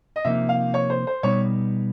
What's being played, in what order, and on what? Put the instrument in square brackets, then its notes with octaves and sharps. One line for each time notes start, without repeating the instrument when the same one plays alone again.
[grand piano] D#5
[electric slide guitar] C3 F3 A#3 D#4 [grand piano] E5
[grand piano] F5
C#5
C5
C5
[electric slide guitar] B2 G3 B3 D#4 [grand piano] C#5